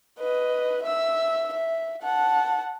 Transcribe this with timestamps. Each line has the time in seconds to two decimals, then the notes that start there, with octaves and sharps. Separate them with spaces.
0.19 B4 D#5
0.83 E5 E6
1.53 E5
2.03 F#5 A5